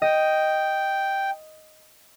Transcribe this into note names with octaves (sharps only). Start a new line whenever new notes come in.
D#5 G5